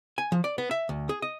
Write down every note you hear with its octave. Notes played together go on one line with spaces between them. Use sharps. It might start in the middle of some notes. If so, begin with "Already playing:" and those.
G#5
F3
D5
B3
E5
D2
G#4
D#5